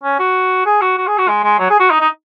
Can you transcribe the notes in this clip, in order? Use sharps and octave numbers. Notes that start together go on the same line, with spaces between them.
C#4
F#4
G#4
F#4
F#4
G#4
F#4
G#3
G#3
F#3
G#4
F#4
D#4
D#4